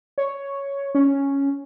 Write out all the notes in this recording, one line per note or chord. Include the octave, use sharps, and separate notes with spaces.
C#5
C#4